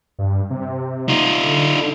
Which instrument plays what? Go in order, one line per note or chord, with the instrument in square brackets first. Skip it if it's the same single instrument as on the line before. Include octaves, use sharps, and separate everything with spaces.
[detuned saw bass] G2
C3
[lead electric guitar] D#4 F4
[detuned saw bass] D3